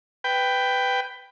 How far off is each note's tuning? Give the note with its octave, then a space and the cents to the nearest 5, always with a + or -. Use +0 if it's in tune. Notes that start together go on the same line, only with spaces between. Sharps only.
B4 +15 G5 +0